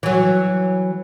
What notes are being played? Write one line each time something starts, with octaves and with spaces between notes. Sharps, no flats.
E3 F#3